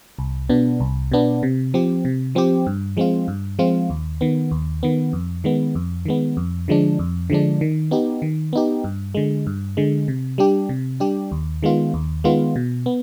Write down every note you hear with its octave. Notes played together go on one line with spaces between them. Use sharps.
C2
B2 B3 D4
C2
B2 B3 D4
C3
F3 C4 G4
C3
F3 C4 G4
G2
F3 G#3 C4 F4
G2
F3 G#3 C4 F4
D#2
D#3 B3
D#2
D#3 B3
F2
D#3 G#3 B3
F2
D#3 G#3 B3
F2
D3 F3 G#3 D4
F2
D3 F3 G#3 D4
D#3
B3 D#4 G4
D#3
B3 D#4 G4
G2
D3 G#3
G2
D3 G#3
C3
G3 D4 G4
C3
G3 D4 G4
D#2
D#3 G#3 B3 F4
D#2
D#3 G#3 B3 F4
B2
B3